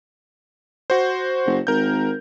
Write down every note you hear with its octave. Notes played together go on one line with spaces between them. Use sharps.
F#4 C5
F#1
G#1 A#4 G6